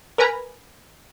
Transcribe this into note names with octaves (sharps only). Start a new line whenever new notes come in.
A#4 B4 G#5 A#5 B5